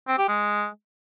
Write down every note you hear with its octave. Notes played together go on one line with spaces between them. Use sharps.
C4
G4
G#3